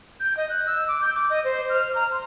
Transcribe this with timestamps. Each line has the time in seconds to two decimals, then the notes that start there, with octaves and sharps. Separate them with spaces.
0.20 G6
0.37 D#5
0.49 F#6
0.67 E6
0.88 D6
1.01 G6
1.15 D6
1.30 D#5
1.44 C5
1.70 F6
1.95 A#5
2.11 C6